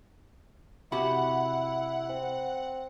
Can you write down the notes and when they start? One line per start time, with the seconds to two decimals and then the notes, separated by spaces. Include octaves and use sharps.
0.92 C3 E4 F#4 G4 F#5 B5
2.10 C4